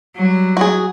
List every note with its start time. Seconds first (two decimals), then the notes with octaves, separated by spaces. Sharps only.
0.16 F#3 G3
0.57 F#4 G#4